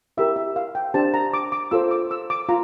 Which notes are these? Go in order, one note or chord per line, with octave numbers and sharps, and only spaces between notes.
E4 G4 A#4 E5
E5
F5
G5
D4 G4 C5 A5
A#5
D6
D6
F4 A4 C5 E6
D6
E6
D6
F4 A#5